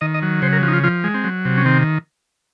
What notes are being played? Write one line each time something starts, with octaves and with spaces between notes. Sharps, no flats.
D#3 D#5
D#5
F#3
C#3 C5
A#4
F3 F#4
D#4
F4
F3 F4
G#3
C4
F#3
C3
C#4
D#3 C4